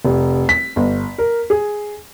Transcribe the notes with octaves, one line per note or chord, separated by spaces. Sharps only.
F1
B6
G1
A#4
G#4